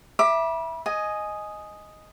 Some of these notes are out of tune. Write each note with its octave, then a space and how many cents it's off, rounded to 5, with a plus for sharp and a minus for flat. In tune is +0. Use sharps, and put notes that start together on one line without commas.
E5 +5 B5 -35 D6 +15
D#5 +0 G#5 +10